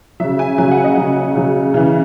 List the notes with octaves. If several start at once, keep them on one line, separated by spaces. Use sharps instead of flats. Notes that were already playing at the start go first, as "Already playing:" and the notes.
C#3 F#3 E5
G#5
C#3 F#3 G#5
F#5
D#5
C#3 F#3
C#3 F#3
C#3 E3